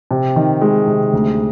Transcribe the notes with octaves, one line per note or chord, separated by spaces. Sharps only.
C3
D#3
G#3
C3
D2